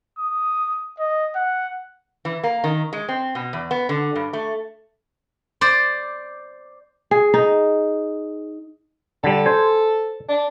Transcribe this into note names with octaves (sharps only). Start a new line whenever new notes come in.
D#6
D#5
F#5
E3
A#3
D#3
G#3
C4
B2
E2
B3
D3
G2
A3
C5 D5
G#4
D#4
D3 G3 A4
C5 G#5
D4